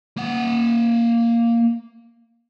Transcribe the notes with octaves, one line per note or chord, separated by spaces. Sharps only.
A#3 F#5